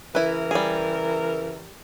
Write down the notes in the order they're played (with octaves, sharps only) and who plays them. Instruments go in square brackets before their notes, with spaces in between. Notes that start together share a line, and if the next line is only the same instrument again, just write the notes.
[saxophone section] C#3 E3 A#4 [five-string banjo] E4 B4
[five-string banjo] G3 G#4